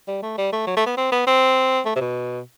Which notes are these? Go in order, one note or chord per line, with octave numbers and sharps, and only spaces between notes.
G3
A3
G3
A3
F#3
A3
B3
C4
B3
C4
A3
C3
B2